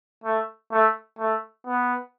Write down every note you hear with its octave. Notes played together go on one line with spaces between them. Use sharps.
A3
A3
A3
B3